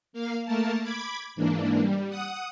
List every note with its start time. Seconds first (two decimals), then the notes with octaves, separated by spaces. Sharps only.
0.13 A#3 F5
0.45 A3 A#3 A#4 A5
0.83 B5 D6 G#6
1.36 G#2 E3 A#3 D4
1.80 G3
2.09 F#5 D#6